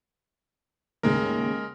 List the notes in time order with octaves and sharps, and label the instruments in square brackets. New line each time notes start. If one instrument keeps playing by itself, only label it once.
[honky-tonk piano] D#2 A2 C#3 [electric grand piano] G#3 A#4